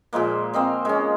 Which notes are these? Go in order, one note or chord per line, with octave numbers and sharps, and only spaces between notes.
A#2 F3 G#3 A#3
A#3 C4 D#5 F5
G#3 C#4